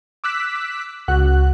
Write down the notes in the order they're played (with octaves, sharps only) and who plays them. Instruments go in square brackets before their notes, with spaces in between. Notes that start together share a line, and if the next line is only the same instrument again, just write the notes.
[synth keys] D6 E6 F#6 B6
C#2 F#4 F#6